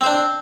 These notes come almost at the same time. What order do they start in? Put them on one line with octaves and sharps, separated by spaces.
C4 C5 D4